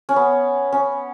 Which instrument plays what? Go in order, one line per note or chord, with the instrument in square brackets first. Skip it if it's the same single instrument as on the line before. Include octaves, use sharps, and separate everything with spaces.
[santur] C#4
B3
C#4